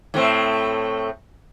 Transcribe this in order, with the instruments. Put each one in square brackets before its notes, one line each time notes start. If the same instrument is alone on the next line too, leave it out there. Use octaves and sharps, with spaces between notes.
[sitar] A2 A3 C4